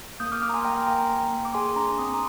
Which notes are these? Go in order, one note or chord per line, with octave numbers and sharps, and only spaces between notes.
A#3 D#6 G6
D6 F6
A#3 D6 F6
A#5
G#5 C6
A#3 G5 A#5
A#3 G5 A#5
A#3
A#3
D6
G#4 G#5 C6
D4 A#5 D6
C4 C6 D#6
A#5 D6